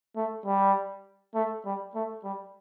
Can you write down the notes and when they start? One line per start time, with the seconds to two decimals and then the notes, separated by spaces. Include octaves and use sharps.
0.16 A3
0.46 G3
1.35 A3
1.65 G3
1.95 A3
2.24 G3